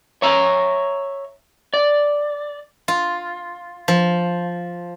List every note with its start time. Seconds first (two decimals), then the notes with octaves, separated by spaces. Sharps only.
0.22 C#5 E5 A#5
1.74 D5
2.88 F4
3.88 F3